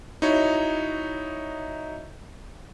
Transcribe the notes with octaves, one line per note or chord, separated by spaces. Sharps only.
D#4 E4 F#4 C#5